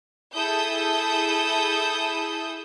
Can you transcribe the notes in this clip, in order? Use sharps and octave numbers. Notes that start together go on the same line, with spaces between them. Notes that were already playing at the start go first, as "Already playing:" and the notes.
E4 G#4 A4 D#6 E6 G6